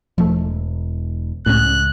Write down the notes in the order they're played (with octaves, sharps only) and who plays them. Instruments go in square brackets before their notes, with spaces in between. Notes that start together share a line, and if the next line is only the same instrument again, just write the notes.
[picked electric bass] E1 [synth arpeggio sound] F3 A3
[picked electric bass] C#2 [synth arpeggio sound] A2 C#4 [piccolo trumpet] F#6